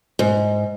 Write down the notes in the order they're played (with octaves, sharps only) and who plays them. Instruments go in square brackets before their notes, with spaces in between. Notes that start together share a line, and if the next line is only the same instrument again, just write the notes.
[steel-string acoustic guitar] G#2